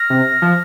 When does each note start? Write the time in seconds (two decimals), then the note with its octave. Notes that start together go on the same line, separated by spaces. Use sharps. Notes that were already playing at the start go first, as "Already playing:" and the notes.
Already playing: F6 A#6
0.10 C3
0.42 F3